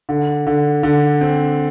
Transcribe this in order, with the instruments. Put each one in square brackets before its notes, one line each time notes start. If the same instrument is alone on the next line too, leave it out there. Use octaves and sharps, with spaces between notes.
[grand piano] D3
D3
D3
C4